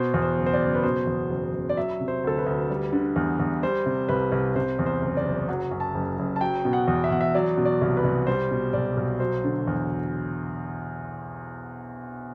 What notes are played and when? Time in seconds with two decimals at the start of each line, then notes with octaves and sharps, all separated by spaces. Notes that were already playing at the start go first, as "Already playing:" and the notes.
Already playing: B2 C5
0.14 E2
0.22 C5
0.38 F#1
0.46 C5
0.53 D5
0.61 F#1
0.75 B4
0.83 B2 C5
1.07 E2
1.30 F#1
1.53 F#1
1.69 D5
1.77 F#3 E5
2.01 C3
2.08 C5
2.24 D2 A4
2.38 B4
2.46 D2
2.70 G3
2.92 D3
3.16 E2
3.39 E2
3.63 G3 C5
3.86 C3
4.09 C2 B4
4.32 C2
4.55 C3 C5
4.79 E2
4.86 C5
5.02 F#1
5.17 D5
5.25 F#1
5.49 F#3 F#5
5.71 F#2
5.80 A5
5.94 F#1
6.19 F#1
6.36 A5
6.41 F#3 G5
6.65 B2
6.73 F#5
6.87 E2
7.04 E5
7.11 E2 F#5
7.21 E5
7.35 F#3 D5
7.57 B2
7.65 D5
7.81 C2
7.97 B4
8.04 C2
8.27 G3 C5
8.51 B2
8.73 B1 D5
8.97 B1
9.20 F#3 C5
9.44 D3
9.67 E2